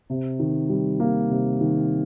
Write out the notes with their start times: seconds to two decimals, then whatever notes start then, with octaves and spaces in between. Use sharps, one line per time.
0.10 C3
0.39 D#3
0.69 G3
1.00 A#3
1.30 C3
1.60 D#3